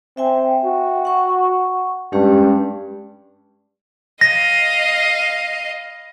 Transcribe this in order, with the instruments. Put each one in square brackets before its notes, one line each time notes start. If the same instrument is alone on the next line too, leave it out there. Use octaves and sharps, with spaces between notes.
[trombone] C4 [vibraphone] E5 G5 G#5
[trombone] F#4
[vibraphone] F#5 C#6
[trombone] G2 [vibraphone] G#3 C#4 G4
[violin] D#5 F5 [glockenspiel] A#6